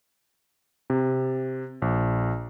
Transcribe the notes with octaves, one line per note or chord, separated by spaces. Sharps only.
C3
A#1